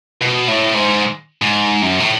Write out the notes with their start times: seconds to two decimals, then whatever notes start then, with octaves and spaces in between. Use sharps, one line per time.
0.22 B2
0.48 A2
0.75 G#2
1.42 G#2
1.82 F#2
2.00 A2